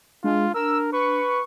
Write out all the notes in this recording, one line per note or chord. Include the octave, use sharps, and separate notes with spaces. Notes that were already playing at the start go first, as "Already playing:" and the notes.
G#3 D4 F4
A#4 E6
B4 C#6